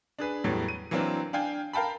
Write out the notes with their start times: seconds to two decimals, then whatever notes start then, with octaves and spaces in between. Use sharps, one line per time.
0.19 D4 G#4 B4
0.44 E2 A2 E3 F#3 G3
0.68 D#7
0.91 E3 F#3 A#3 C4 D4
1.33 D4 F5 G5 G#5
1.73 A#4 F5 G5 A5 B5